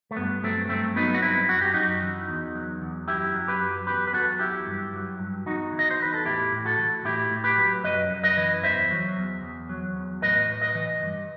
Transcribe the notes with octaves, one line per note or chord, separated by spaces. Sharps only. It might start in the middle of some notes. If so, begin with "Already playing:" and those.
A3
G2 B3
F#3 A3 C4
G2 A3 C4
F#3 B3 D#4
F#4
G2 C4 E4
F#2 F#4
G4
F#2 D#4 F#4
E3
E2
F#3
E2
F#2 E4 G4
F#3
G4 B4
F#2
E2 G4 B4
B4
F#3 F#4 A4
E2 E4 G4
G2
F#3
G2
E2 D#4 F#4
E3
D#5
C5
E2 B4
A4
A2 E4 G4
A2
F#4 A4
E3
A2 E4 G4
A2
G4 B4
F#3
F#2 B4 D#5
F#2
B4 D#5
E3
E2 C5 E5
F#3
E2
E2
F#3
E2
A2 B4 D#5
A2
B4 D#5
E3
G2